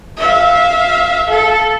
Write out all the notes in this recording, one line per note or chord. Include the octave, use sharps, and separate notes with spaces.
E5 F5
A4